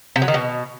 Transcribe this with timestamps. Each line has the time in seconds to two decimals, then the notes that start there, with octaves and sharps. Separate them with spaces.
0.16 C3
0.22 F#3
0.28 D#3
0.34 B2